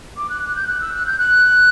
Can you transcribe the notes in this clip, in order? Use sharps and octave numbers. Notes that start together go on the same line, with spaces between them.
D6
F#6
F#6
G6
F#6
E6
F#6
G6
F#6